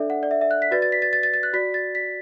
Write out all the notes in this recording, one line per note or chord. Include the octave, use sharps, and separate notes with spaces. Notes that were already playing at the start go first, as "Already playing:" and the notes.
Already playing: D4 A4 D5 E5
F#5
D5
E5
E5
F#6
B6
F#4 B4 D5 A6
A6
B6
A6
A6
A6
A6
F#6
F#4 D5 B6
A6
B6